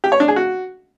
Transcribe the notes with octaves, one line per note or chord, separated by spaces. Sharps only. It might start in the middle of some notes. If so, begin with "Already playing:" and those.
G4
C#5
D4
G#4
F#4